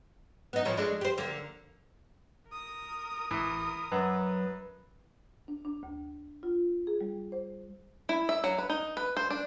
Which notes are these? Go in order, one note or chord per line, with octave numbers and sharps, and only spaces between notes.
B3 D#4
A2 F3 C#4
G#3 A3 D4
G4 C5
D3 A#3
A#4 D#6
A1 E3
F#2 F#3 B4
D4
D4
D2
F4
G#4
G3
C5
E4
E5
F#3
B4
D#4
B4
C5
D4